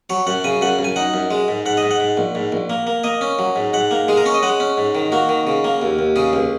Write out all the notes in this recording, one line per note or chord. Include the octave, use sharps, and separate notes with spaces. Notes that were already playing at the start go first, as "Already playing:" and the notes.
F#3 C#5
F#2 F#5
C#3 G#5
F#2 F#5
F#2
G#5
D#4 F#5
F#2
G#3
G#2
G#2 F#5
D#5
G#2
F#5
G#2
A#1
G#2
A#1
A#3
A#3
A#3 D#5
C#4
F#3
G#2
G#2 F#5
A#3
G#3 G#4
A#4
C#4 C#5
D#5
G#3 F#5
C#4
G#2
D#3
A#3 F#4
D#3
C#3
A#3
D#2
D#2
C#3 G#4
C#2